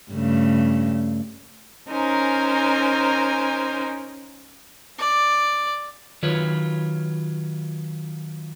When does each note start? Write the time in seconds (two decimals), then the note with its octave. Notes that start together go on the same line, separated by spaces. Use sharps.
0.11 G2 C#3 A3
1.90 C#4 D#4 A#4 C5 G#5 A#5
4.98 D5
6.23 D#3 F#3 F4 B4 C#5